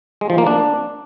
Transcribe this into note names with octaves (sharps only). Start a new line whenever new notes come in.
G#3
F3
A#3
D4